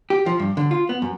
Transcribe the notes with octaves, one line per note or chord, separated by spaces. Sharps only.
G4
F3
G2
D3
F4
B3
F#2